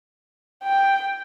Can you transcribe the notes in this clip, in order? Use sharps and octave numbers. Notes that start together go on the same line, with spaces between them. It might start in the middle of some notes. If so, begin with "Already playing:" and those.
G5